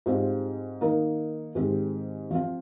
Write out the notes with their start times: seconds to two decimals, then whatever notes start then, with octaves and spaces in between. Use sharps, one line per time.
0.06 G#2 G3 C4 F4 C5
0.81 D#3 A#3 D#4 A#4
1.55 G#2 D#3 G#3 C4 G4
2.31 F3 C4 F4